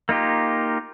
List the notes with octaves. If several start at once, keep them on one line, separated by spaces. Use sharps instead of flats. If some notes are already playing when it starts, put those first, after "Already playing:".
A#3 D#4 F4 G4